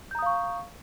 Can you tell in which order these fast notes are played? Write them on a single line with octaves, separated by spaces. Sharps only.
G6 A#5 D#6 F5 C#6